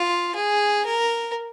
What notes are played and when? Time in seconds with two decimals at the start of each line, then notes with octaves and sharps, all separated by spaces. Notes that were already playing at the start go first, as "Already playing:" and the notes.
Already playing: F4
0.35 G#4
0.85 A#4